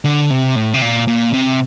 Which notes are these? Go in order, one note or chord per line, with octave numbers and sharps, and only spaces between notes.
D3
C3
A2
C3
A#2
A#2
C3